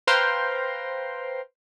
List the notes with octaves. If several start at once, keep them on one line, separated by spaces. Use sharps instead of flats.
B4 C5 F5 G5 A#5 C6